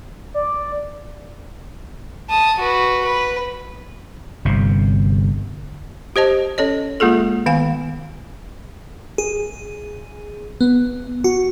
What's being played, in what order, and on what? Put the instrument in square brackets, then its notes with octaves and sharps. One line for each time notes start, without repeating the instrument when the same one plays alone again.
[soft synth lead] D5
[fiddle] A5 D#6
F#4 B4
B4
[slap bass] G1 C3
[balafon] G4 C5 D#5 A5
C#4 A4 C#5 D#5
G#3 A#3 F4 G#4 A4
D#3 B3 F5 G#5
[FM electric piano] G#4
B3
F#4